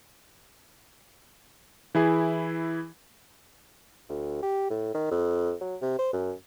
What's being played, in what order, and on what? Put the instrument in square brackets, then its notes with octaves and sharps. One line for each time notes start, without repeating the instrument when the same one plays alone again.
[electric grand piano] E3 E4 G#4
[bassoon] D2
G4
A2
D#3
F2
F#3
C3
C5
F#2